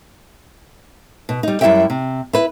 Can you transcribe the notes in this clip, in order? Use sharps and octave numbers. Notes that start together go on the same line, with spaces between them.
B2
G3 D#4
F#2 G3 E4 G4 E5 G5
C3
E4 B4